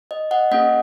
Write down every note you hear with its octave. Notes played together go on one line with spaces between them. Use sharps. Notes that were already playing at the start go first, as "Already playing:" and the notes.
D#5
D#5 F#5
A#3 C#4 G#4 D#5 F#5